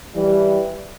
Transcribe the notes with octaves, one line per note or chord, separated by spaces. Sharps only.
E3 G3